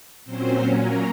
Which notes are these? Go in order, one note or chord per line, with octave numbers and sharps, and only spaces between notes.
A#2 F#3 C4 C#4 C5
A#3 A#4